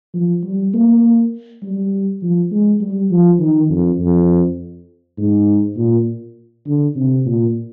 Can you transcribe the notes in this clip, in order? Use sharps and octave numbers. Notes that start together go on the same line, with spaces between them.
F3
G3
A#3
G3
F3
G#3
G3
F3
D#3
F2
F2
G#2
A#2
D3
C3
A#2